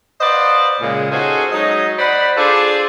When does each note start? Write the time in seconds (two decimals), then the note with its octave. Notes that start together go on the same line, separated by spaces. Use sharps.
0.21 B4 C5 D5 D#5 F5 F#5
0.81 A#2 C#3 G#3
1.12 C#4 D#4 F#4 G#4 A4 C5
1.52 F#3 G#3 D#4 D#5
1.99 C5 D5 F#5 B5
2.37 D4 F4 G#4 A4 C5 D5